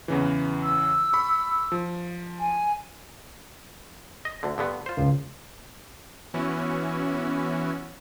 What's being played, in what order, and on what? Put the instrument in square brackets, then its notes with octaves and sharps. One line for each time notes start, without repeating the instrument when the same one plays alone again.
[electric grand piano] E2 C#3 E3
[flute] E6
[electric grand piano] B5 C#6
F3
[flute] G#5
[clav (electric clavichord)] D#5
D2 D3
G2 D3 B3
F4 C5
[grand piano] C#2
[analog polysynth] E3 B3 C#4 E4 F#4